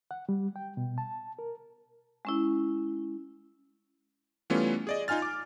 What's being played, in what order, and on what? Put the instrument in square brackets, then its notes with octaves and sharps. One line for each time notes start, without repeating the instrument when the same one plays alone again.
[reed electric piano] F#5
G3
G5
B2
A5
A#4
[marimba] G#3 C#4 E4
[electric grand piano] E3 G3 A3 B3 C#4 F4
G#4 D5 D#5
D#4 F4 G#5 F6 A6
D6